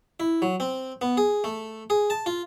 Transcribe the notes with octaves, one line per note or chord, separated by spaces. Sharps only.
E4
F#3
C4
B3
G#4
A3
G#4
A5
F4